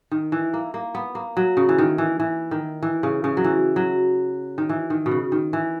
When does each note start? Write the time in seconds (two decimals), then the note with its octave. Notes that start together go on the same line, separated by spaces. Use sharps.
0.11 D#3
0.32 E3
0.54 A#3
0.74 A#3
0.95 B3
1.15 A#3
1.37 F#3
1.57 C#3
1.69 E3
1.78 D#3
1.98 E3
2.20 E3
2.51 D#3
2.83 E3
3.03 C#3
3.24 C#3
3.37 F#3
3.44 E3
3.76 F#3
4.58 D#3
4.69 E3
4.90 D#3
5.06 B2
5.11 C#3
5.32 D#3
5.53 E3